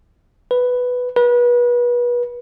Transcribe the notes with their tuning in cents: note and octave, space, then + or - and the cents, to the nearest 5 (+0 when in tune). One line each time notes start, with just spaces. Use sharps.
B4 +5
B4 -30